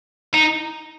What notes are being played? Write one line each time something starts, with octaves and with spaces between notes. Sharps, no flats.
D#4